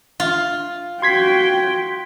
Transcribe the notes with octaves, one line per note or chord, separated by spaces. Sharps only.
F4
F#4 G5 C6 G#6 B6